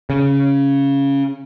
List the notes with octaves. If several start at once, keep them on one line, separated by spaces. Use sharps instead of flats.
C#3